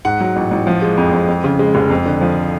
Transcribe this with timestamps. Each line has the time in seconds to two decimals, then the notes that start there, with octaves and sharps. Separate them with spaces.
0.05 G#2 F#5
0.21 F#3
0.36 A1
0.51 A1
0.67 F3
0.82 G#3
0.97 F2
1.13 F2
1.28 F2
1.44 C#3
1.59 G#3
1.75 F1
1.90 F2
2.06 D3
2.21 F3